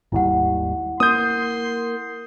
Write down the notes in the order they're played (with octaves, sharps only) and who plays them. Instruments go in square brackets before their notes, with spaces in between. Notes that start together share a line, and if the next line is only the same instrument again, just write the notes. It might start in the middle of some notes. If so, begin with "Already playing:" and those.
[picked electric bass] G#1 D#2 G3 [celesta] E4 F#5
[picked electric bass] A#3 [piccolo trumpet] C6 [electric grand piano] D#6 G6